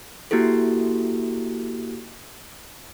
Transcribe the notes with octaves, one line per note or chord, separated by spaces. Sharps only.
A#3 E4 F#4 G4 A4